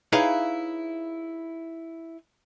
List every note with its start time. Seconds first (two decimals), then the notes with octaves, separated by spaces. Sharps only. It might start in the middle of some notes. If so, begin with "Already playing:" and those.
0.12 D#4 E4 G#4 B4 C#5 F5